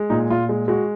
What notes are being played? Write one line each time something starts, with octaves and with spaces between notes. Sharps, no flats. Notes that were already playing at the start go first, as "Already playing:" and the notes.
Already playing: G#3
A#2 D#4
A#2 F4
G#3
G#3 F#4